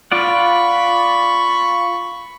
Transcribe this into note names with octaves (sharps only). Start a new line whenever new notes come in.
F4 D5 F#5 B5 C#6